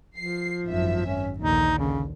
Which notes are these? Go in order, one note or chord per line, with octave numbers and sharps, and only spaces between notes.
F3 C7
G#1 F#2 E5
C#4
A#1 D#2 D3 D#4
C#3